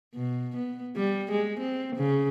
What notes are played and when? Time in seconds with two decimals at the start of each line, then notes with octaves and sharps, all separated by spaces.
0.15 B2
0.57 B3
0.97 G3
1.31 G#3
1.60 C4
1.96 C#3